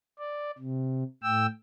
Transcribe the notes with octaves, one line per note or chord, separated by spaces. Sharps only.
D5
C3
A2 G5 E6